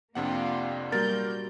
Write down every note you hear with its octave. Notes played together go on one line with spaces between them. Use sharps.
F2 C3 A#3 D4 F4 G4 F#5
A#2 F#3 G3 A#3 A#4 G6 A6